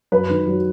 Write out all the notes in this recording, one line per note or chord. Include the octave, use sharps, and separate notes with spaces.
F#2 B4
D#3
F#3